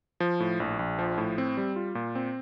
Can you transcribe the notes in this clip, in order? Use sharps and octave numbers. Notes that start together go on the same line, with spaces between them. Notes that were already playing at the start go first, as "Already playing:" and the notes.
F3
A2
A#1
A#1
F3
A2
C4
G3
F4
A#2
C4